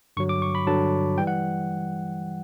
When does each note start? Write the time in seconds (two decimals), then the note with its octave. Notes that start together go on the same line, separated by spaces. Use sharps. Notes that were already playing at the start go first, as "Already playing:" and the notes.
0.17 G2 D3 F#3 C#6
0.29 D6
0.42 C#6
0.55 B5
0.67 G2 D3 F#3 A5
1.18 E3 G3 G5
1.27 F#5